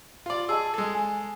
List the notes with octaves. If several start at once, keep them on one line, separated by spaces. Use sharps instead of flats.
F4 D5
G#4 D#5 A5 E6
G#3 A4
G#5